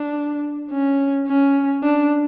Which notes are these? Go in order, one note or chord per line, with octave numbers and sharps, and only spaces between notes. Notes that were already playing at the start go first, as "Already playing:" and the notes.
Already playing: D4
C#4
C#4
D4